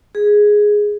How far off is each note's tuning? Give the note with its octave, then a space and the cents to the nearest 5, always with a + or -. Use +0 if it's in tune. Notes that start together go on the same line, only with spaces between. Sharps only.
G#4 +0